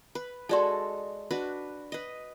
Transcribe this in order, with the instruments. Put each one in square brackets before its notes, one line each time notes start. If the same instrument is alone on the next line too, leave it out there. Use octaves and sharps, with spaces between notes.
[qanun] B4
[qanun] G#3 F#4 A4 [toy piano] D#4 D5 C6
[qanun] D4 F#4 B4
B4 D#5